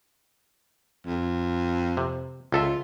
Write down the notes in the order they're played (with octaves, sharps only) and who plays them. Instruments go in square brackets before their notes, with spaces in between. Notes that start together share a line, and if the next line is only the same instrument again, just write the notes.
[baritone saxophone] F2
[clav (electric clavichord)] C3
[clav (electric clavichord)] C#2 A4 E5 [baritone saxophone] F4